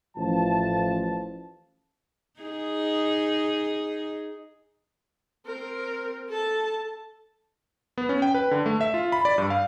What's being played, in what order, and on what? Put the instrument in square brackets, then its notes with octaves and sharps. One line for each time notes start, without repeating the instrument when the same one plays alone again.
[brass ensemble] A1 F3 A5
[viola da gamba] D#4 G#4
[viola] C4 A#4
A4 A5
[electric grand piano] B3
C#4
G5
B4
D3
A3
E5
F4
B5
D5
G2
F5